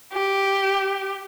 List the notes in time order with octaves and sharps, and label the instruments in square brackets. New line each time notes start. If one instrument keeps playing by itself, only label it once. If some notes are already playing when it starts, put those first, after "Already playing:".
[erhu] G4